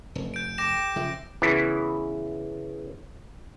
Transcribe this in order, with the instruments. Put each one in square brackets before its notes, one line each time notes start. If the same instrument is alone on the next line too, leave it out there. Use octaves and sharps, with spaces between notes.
[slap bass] F1
[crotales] G6 D7
[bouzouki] G4 A4 [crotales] D6 A#6 E7
[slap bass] C#3 F3 [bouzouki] E5
[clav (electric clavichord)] C#3 E3 B3 E4